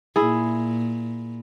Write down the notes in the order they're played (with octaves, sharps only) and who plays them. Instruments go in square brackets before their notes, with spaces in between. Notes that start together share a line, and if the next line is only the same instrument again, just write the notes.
[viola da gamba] A#2 [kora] E4 G#4